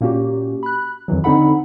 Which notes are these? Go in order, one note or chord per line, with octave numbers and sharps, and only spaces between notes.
A#2 A#3 C#4 F#4 G4
B5 F#6
F2 D#3 E3 F#3
D3 C4 D#4 A4 F#5 B5